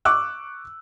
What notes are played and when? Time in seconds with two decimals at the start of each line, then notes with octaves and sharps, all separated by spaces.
0.05 C#6 D6 E6 F#6